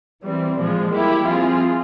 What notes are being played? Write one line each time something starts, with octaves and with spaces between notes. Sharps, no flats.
E3 G3 C4
A#2 F3 G#3
G3 A#3 E4 G4
F3 C4 F4 G#4